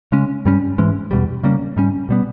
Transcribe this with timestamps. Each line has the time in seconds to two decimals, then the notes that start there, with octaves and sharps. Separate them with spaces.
0.12 C#3 G#3 C#4
0.45 G2 G3 C#4
0.78 G#2 E3 G#3 C#4
1.11 E2 B2 G3
1.43 C#3 G3 A#3 C#4
1.76 G#2 G3 C#4
2.09 B2 G3 B3